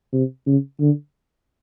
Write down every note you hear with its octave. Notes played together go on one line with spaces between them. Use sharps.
C3
C#3
D3